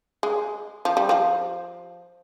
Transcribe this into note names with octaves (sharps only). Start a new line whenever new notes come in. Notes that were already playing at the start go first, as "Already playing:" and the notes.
G#3
F3
G3
F3